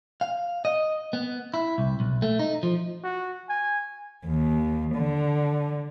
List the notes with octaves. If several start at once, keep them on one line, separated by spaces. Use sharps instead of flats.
F5
D#5
B3
E4
C2
B1
A3
D#4
F3
F#4
G#5
D#2
D3